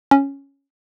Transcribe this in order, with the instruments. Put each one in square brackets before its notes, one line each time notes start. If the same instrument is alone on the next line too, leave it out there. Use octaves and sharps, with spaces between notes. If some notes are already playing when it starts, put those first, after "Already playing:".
[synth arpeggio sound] C#4